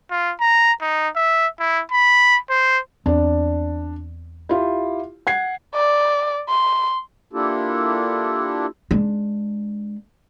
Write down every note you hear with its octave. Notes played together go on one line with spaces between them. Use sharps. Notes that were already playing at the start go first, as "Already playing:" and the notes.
F4
A#5
D#4
E5
E4
B5
C5
E2 C4 D4 D5
E4 F4 G4
F#5 G#6 C7
D5
C6
A#3 D4 E4 F4 G4 A4
G#3 D4